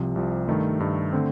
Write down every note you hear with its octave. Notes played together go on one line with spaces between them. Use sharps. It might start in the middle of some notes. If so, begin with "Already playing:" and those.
Already playing: C2 C3 F3
C2 C3 F3
G2 D#3 A3
G2 D#3 A3
D3 A3 C4